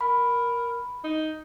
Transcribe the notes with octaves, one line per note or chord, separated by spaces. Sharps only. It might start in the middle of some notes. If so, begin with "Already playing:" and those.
A#4 B5
D#4